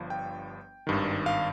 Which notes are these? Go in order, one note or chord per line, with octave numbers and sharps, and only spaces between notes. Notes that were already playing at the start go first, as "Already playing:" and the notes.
Already playing: G1 G2 F3
G5
G#1 G2 D#3
F5